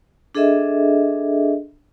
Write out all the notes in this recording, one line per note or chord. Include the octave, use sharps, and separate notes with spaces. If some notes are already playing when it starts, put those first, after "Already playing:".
D4 G#4 A4 D#5 E5